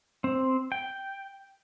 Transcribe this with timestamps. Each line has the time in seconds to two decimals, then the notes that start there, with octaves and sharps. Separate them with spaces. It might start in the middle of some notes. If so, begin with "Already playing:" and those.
0.24 C4
0.72 G5